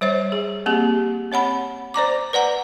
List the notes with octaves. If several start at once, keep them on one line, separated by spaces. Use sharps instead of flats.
G3 C5 C#5 E5
G#4
A#3 C4 G4 G#4
C4 C#5 F#5 B5
C5 D5 A#5 D6
B4 D5 F#5 A#5